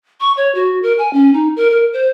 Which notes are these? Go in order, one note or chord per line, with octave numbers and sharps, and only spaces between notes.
C#6
C#5
F#4
A#4
G#5
C#4
D#4
A#4
A#4
C5